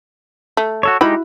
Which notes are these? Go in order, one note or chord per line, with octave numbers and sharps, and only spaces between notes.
A3
F#4 A4 C#5
G#3 D#4 E4 F#4 G4 B5